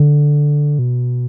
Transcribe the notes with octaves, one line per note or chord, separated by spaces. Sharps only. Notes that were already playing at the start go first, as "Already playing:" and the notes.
Already playing: D3
B2